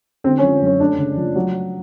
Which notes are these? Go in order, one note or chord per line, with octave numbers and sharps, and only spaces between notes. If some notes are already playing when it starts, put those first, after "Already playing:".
D3 C4
C#4
F3
F#2 C#4
A3 D4
C#3
F3
F#3